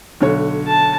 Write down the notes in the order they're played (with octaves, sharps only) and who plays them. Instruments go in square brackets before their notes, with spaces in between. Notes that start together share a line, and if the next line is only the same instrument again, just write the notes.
[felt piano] B1 D3 C#5
[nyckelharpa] A5